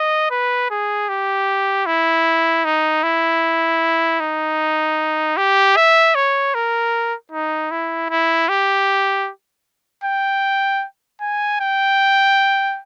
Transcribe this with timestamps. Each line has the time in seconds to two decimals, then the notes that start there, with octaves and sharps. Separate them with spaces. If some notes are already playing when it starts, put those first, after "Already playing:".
Already playing: D#5
0.31 B4
0.70 G#4
1.09 G4
1.86 E4
2.65 D#4
3.03 E4
4.20 D#4
5.37 G4
5.77 E5
6.15 C#5
6.54 A#4
7.32 D#4
7.71 E4
8.10 E4
8.49 G4
10.04 G5
11.21 G#5
11.60 G5